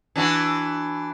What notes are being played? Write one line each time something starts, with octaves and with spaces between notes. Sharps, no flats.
E3 D4 F#4